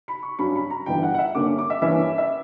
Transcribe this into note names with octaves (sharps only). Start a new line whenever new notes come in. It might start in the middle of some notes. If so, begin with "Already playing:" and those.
B5
C#6
G2 F#3 C#4 B5
B5
A#5
G1 G2 E3 G5
F#5
F#5
E5
G2 D3 A#3 C#4 D6
D6
E5
G2 E3 A#3 C#4 E5
E5